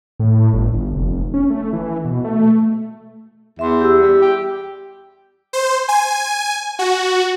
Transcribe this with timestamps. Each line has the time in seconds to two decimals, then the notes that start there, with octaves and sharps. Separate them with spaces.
0.20 A2
0.53 G1
0.74 G1
0.94 F1
1.34 C#4
1.50 A3
1.73 E3
2.05 B2
2.24 A3
3.59 E2 E5 C6
3.81 G4 E6
4.01 G3
4.22 G4
5.53 C5
5.88 G#5
6.79 F#4